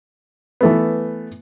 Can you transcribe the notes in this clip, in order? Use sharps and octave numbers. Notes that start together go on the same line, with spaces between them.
E3 A3 B3